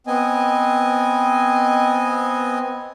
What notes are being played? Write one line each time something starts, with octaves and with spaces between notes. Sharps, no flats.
B3 C4 D#5 G#5